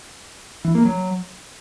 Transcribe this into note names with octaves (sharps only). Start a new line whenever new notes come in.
E3
A#3
F#3